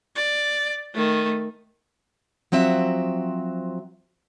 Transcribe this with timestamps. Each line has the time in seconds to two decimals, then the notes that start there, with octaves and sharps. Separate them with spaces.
0.15 D5
0.93 D#3 A3
2.52 F3 F#3 C4 F#4 E5